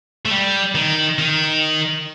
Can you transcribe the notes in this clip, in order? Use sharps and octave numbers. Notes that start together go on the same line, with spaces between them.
A3
G3
D#3
D#3